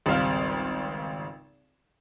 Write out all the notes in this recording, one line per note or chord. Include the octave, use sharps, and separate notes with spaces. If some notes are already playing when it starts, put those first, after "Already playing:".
G#1 C#2 G3 C4 F5